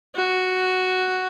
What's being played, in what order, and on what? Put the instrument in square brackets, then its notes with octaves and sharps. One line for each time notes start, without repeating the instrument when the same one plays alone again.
[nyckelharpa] F#4